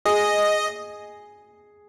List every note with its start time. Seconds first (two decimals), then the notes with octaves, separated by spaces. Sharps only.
0.05 G#4 D#5